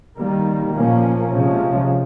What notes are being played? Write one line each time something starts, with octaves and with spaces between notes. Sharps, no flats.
D#3 G3 A#3
A#2 F3 A#3 C#4
C3 F3 G#3 C#4